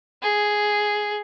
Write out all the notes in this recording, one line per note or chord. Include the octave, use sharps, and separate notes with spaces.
G#4